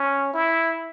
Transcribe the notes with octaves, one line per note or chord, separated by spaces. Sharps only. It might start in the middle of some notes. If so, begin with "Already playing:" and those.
Already playing: C#4
E4